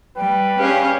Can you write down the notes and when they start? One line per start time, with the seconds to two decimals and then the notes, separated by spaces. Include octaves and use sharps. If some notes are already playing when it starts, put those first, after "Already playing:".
0.16 G3 B4 G5
0.58 G2 C#4 G4 G#4 F5